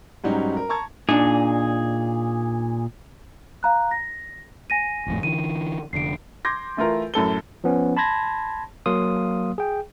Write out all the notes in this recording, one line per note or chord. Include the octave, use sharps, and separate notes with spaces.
G#2 F#3 G3 C#4 D#4
A#4
A5 A#5 C#6 G#6
A#2 D4 D#4 G#4
F5 A#5 F#6
A#6
G#5 A#6 D#7
G#1 F2 A2
D3 E3 D#7
F1 D3 C7 D7
C6 D6 G6 G#6 A#6
E3 A3 F4 A#4
F#2 A2 A4 G7
F3 B3 C#4
A5 B5 C6 G#6 A#6
F#3 A#3 F5 C6 D#6
G#4 G5